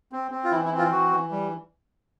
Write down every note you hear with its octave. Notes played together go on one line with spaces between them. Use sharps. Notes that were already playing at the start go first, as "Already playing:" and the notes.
C4
C4
F4
E3 E4
E4
C4
F4
E3 F#4
E3
G3